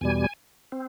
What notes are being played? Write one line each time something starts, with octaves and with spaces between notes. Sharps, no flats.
E2 B2 G3 G#5
C4